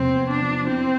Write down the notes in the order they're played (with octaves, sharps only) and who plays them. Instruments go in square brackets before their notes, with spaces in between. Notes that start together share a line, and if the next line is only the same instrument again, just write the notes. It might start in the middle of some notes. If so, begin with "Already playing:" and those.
Already playing: [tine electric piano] E2 C3 F3 B3 [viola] C4
[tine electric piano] B3
[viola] D4
[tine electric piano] F3
[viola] C4 [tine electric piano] E4